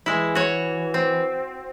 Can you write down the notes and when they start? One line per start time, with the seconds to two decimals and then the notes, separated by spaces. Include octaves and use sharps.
0.06 E3 G#3 E4
0.35 F#4 C#5
0.94 C4